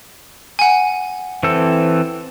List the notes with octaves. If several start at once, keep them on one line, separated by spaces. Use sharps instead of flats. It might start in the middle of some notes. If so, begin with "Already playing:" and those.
F#5 G#5
E3 C4 A4